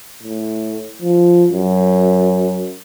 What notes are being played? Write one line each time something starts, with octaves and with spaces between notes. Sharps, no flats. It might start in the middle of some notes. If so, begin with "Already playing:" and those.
A2
F3
F#2